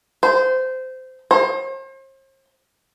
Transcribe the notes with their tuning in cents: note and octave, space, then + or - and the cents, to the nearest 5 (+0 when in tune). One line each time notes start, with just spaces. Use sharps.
C5 -20
C5 +40